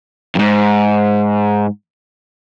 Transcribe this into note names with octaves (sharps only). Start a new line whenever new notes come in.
F2 G#2